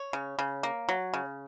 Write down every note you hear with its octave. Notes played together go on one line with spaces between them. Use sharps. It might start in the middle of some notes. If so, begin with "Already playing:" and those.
Already playing: C#5
C#3
C#3
A#3
F#3
C#3